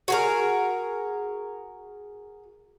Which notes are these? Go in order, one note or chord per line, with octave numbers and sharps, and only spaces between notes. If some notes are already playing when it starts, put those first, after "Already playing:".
F#4 G#4 A#4